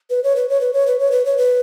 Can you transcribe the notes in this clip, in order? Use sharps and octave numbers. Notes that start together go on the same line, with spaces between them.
B4
C#5
B4
C#5
B4
C#5
B4
C#5
B4
C#5
B4